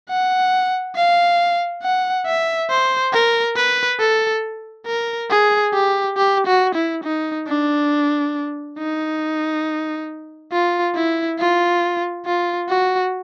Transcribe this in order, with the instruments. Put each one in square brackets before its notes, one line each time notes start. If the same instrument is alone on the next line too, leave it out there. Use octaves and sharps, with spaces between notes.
[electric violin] F#5
F5
F#5
E5
C5
A#4
B4
A4
A#4
G#4
G4
G4
F#4
E4
D#4
D4
D#4
F4
E4
F4
F4
F#4